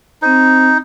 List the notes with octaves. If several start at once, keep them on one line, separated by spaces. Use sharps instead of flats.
C4 D#4 C5